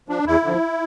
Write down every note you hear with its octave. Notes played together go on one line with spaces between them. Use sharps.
F3 D4
E2 E4
D3 F3